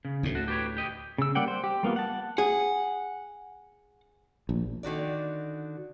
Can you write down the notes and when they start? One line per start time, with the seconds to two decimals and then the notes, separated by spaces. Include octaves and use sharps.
0.05 C#3
0.23 D2 A2
0.35 F#4 A4
0.48 G4 B4 C#5
0.77 G4 D#5
1.18 C#3 E6
1.35 G3 A#3 D5 F#5 G5
1.48 C5
1.64 G4
1.83 G3 A#3 B3 F4
1.96 F#5 A5
2.38 G#4 F#5
4.49 A#1
4.83 D3 D#3 F#4 D5